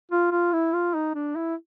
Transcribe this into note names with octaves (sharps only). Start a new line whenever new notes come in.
F4
F4
E4
F4
D#4
D4
E4